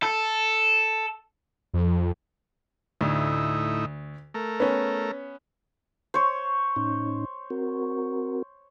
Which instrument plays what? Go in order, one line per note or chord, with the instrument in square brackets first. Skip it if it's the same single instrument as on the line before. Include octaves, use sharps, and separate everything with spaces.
[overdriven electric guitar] A4
[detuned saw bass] F2
[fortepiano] D2 [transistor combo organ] A2 D#4 E4
[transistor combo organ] A3 A#4
[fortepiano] B3 C#4
[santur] C5 C#5
[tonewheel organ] A2 C#4 D#4
C4 F#4 A#4